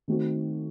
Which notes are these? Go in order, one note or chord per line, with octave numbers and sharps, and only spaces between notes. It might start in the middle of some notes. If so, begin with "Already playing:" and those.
D#3 A3 C4 F#4